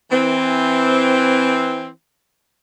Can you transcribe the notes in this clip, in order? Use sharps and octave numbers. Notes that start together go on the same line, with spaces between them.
E3 C4